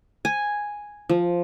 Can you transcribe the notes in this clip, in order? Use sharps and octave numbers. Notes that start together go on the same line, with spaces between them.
G#5
F3